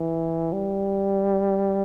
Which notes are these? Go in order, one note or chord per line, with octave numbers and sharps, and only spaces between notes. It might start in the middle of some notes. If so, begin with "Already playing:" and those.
Already playing: E3
G3